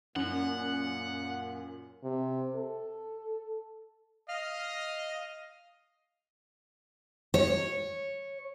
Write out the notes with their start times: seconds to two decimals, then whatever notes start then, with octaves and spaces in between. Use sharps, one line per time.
0.16 F#2 A#2 F#5
2.04 C3
2.56 A4
4.29 D#5 F5 F6
7.34 C#5